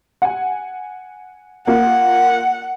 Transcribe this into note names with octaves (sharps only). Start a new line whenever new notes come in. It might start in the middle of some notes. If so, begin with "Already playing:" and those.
F#5 G#5
A#3 F4 F#5